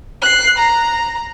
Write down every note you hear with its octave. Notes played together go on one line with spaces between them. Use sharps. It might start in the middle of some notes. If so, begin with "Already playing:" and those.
F#6 C7
A#5